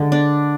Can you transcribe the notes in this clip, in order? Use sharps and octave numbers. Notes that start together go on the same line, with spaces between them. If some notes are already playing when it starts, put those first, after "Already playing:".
Already playing: D3 G#3
D4